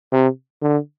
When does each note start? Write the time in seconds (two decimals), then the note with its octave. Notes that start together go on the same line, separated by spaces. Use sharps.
0.12 C3
0.62 D3